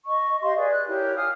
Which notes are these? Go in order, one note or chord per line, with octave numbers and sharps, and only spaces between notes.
D#5 C#6
G4 D#5 F5 C6
G#4 B4 D5
F#6
E4 G4 A#4 C#5
F5 G#5 D#6 F6